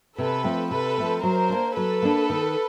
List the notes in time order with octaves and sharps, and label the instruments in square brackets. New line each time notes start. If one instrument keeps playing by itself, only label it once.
[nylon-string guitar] C3 [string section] A4 B4
[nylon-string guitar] F3 A3 C4
[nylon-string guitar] C3 [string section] A4 B4
[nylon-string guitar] F3 A3 C4
[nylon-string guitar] F#3 [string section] A#4 C5
[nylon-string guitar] A#3 D4
[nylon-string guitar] F#3 [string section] A4 B4
[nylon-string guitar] A#3 D4
D#3